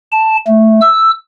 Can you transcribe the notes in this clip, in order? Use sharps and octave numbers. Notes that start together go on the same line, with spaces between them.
A5
A3
E6